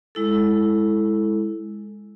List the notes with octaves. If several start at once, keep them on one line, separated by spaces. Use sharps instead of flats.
G#3 E4 A4